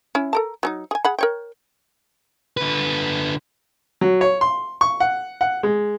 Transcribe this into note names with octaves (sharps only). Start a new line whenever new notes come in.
C#4 E4
A4 A#4 A5
F#3 C#4 D#4
G#4 G#5
G#4 F#5 B5
A#4 C#5 G5
D3 B4
F#3
C#5
C6
C#6
F#5
F#5
G#3